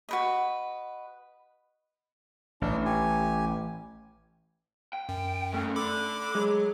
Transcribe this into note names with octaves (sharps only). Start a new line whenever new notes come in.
F#4 B4 D#5
A1 D4
G4 G#5
G5
F#2
D#3 A3 C#4
A4 D5 B5 D6
F#3 G#3